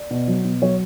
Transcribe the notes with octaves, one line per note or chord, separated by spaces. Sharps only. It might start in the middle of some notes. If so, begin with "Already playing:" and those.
Already playing: D5
B2
F#3
B2
F#3 C#5